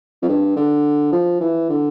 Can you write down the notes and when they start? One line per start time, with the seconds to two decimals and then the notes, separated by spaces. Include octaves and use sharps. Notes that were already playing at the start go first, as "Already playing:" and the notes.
0.22 F2
0.28 G2
0.56 D3
1.12 F3
1.40 E3
1.69 D3